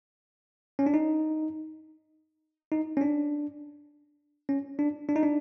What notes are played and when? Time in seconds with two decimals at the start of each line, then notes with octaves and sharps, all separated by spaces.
0.79 C#4
0.86 D4
0.94 D#4
2.72 D#4
2.97 C#4
3.01 D4
4.49 C#4
4.79 D4
5.09 D4
5.16 D#4
5.23 D4